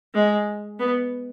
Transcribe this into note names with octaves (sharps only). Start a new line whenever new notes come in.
G#3
B3